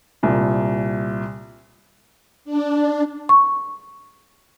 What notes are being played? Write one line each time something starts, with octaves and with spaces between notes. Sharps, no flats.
C2 A#2
D4
C#6